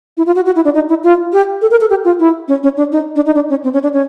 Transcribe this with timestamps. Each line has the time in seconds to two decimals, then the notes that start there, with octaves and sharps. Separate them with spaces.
0.17 E4
0.26 F4
0.35 F#4
0.46 F#4
0.56 E4
0.65 D4
0.75 D#4
0.89 E4
1.04 F4
1.33 G4
1.62 A4
1.71 A#4
1.81 A4
1.90 G4
2.05 F4
2.20 E4
2.48 C#4
2.63 C#4
2.77 D4
2.92 D#4
3.16 D4
3.26 D#4
3.35 D4
3.50 C#4
3.64 C4
3.73 C#4
3.83 D4
3.93 C#4